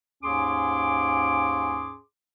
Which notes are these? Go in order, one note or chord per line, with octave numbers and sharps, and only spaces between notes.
D#2 G#2 C#4 G#4 C6 D6